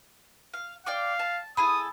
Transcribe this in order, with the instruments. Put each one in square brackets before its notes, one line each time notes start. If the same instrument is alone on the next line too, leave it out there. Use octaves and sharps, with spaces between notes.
[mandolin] F5
[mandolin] D5 G5 D6 [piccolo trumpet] F5
[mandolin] A5
[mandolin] E4 G#4 A4 [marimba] B5 [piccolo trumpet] D#6